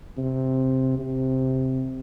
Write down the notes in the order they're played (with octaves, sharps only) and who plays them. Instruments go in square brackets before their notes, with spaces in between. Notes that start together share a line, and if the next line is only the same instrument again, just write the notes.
[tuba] C3
C3